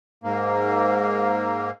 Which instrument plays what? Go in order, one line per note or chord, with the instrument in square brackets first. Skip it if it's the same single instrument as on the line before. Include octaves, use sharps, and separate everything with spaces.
[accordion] G#2 A#3